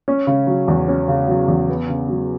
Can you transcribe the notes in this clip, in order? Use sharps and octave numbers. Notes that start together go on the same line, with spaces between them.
C#4
C#3
F#3
E2
C#4
C#3
F#3
E2
B3
C#3
F#3